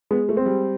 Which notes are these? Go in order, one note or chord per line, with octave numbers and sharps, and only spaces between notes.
G#3 B3
A3
C4
G3